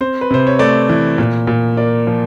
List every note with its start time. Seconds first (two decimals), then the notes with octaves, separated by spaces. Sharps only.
0.01 C4 C5
0.21 B4
0.31 C3 C5
0.47 C#5
0.59 A3 D5
0.89 E3
1.18 A#2
1.47 A#2
1.77 A#3 D5
2.07 F3